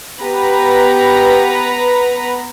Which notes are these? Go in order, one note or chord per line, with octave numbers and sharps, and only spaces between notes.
B3 G4 B4 A#5